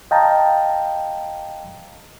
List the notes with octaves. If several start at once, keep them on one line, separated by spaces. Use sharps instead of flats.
D#5 F5 G5 A5 A#5